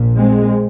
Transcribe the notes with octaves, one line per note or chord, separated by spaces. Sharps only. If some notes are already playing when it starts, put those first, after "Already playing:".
Already playing: A#1 A#2
G#3 C4